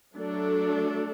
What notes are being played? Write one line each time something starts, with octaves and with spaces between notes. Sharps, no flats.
F#3 A3 D4 A4